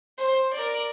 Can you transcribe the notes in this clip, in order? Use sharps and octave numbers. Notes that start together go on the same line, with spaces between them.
C5
A#4 D5